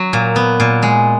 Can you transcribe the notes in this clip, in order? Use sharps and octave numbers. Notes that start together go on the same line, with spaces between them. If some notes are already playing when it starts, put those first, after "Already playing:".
Already playing: F#3
A#2
B3
A#2
G#3